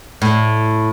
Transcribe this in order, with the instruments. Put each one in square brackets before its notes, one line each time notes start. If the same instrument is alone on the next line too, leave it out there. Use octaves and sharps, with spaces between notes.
[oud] A2